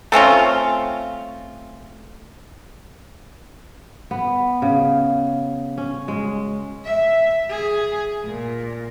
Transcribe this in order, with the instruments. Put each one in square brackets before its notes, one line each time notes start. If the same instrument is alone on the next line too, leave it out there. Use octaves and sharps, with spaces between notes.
[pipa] A3 C4 C#4 F4
[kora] B3
C#3
C#4
G#3
[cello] E5
G#4
A#2